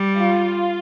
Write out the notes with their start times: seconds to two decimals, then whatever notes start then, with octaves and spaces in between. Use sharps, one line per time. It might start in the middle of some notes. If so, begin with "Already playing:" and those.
Already playing: G3
0.17 F4